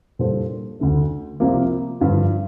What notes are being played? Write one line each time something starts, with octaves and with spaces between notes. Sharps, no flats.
A#2 G3 D4 A4 C5
D2 D3 A3
C2 C3 F3 A#3
G2 D3 F3